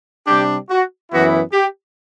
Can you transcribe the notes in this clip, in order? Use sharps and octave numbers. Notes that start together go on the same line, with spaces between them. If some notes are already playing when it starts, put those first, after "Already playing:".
C3 G3 D4 G4
F#4
F#2 E3 B3 E4 F#4
G4